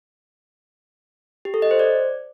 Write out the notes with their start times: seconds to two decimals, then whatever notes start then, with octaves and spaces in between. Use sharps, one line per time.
1.45 G4
1.54 A4
1.62 D#5
1.71 C5
1.79 D5